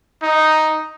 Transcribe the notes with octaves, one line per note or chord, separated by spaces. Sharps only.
D#4